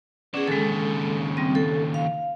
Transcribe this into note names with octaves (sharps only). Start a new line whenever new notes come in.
B3 C#4 G#4 D5
D#2 C#3 G#3 A4
G3 C4
A4
F5